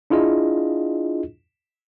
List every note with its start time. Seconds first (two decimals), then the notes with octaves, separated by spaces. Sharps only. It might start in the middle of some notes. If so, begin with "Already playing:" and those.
0.10 D4 E4 F4 G#4 D#5